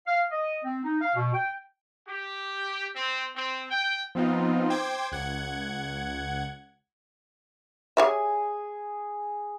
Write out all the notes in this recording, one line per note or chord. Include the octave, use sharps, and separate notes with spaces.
F5
D#5
C4
D#4
F5
B2
G5
G4
C4
C4
G5
F3 B3 C4 D#4 F4
C5 G5 D6 G#6
C#2 F#5 G#6
G4 G#4 C#5 E5 G#5